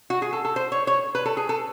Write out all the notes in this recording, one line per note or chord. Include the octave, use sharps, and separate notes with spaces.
F#4
G#4
A4
A4
C5
C#5
C#5
B4
A4
G#4
A4